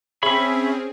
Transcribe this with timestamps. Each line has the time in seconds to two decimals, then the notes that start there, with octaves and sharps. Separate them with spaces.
0.23 C4 C#4 G#4 C#5 E5 B5